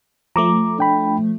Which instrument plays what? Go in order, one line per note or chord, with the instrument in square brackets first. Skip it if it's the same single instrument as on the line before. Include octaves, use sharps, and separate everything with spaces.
[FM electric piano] F3 A3 [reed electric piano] A#5 D6
[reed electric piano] D4 G5 B5